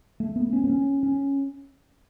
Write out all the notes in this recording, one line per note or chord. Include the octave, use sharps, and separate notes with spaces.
A3
B3
C#4
B3
C#4
C#4